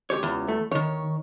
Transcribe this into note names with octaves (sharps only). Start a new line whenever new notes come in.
C#2 G4 C#5
E2
A3
D#2 D#3 C#5